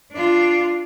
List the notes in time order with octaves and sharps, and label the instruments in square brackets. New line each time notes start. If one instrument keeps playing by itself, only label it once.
[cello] D4 F4